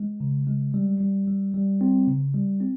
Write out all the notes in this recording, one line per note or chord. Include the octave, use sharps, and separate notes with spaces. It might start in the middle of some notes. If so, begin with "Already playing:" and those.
Already playing: G#3
C#3
G#3
G3
G3
G3
G3
C4
C#3
G3
C4